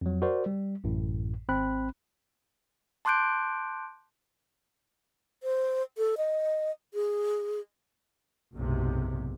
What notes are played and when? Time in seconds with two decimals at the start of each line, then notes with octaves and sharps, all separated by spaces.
0.01 F2 F#3
0.22 F#4 A#4 C5 D5
0.46 G3
0.84 A1 F#2 A2
1.49 G#1 C4 B5 F#6
3.05 A5 C6 D6 F#6 G6 D7
5.43 C5
5.98 A4
6.18 D#5
6.94 G#4
8.54 F#1 B1 G#2 C3